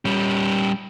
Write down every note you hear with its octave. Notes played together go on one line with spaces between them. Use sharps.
G3 C#4